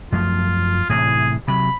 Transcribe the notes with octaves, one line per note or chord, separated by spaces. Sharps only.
F#2 F3 A3 F4
A2 C3 E3 G#4
C3 F#3 B5